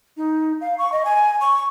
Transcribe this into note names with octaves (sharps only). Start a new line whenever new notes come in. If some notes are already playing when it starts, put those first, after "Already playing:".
D#4
F5
C#6
D#5
G#5
C#6